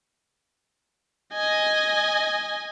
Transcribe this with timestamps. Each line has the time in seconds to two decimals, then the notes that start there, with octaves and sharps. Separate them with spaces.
1.33 D#5 G#5